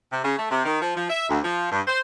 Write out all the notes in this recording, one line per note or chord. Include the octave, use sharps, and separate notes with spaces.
C3
C#3
A3
C3
D#3
F3
F3
E5
D2
F3
G2
C5